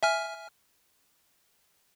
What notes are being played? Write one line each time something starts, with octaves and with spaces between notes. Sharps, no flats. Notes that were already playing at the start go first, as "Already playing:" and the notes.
E5 G#5 F6